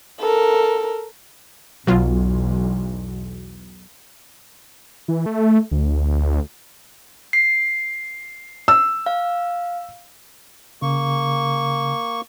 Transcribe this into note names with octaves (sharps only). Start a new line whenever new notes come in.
A4 A#4
B1 E2 B2 F#3 F4
E3
A3
D2
C7
E6
F5
C#3 A#3 C#6